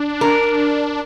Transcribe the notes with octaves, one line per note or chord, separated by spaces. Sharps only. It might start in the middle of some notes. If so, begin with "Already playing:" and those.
Already playing: D4
A#4